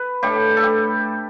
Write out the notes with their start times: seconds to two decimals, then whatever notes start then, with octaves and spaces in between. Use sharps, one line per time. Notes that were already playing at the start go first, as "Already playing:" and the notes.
Already playing: B4
0.23 A2 G3 D4 G4
0.57 A4
0.63 G4